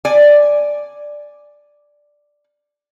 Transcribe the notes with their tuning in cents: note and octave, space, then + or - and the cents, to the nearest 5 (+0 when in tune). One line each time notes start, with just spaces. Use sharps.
D5 +0 G#5 +0